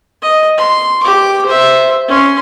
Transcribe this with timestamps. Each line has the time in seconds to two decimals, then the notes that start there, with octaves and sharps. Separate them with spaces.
0.22 D#5
0.57 C6
1.03 G4 D6
1.46 C5 E5
2.08 C#4 C6